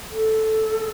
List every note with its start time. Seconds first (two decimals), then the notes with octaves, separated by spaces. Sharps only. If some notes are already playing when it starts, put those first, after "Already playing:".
0.11 A4